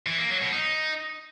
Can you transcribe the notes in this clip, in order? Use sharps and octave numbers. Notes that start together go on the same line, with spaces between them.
E3
A#3
F#3
B2
D#4